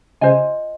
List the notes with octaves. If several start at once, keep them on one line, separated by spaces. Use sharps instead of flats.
C#3 F4 C5 D#5 G#5